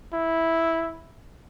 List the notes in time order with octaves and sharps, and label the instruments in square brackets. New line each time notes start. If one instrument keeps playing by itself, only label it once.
[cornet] E4